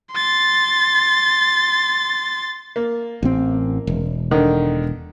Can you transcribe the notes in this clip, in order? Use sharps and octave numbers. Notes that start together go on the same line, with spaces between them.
C6 A6
A#3
A1 C4
E1
D3 D#3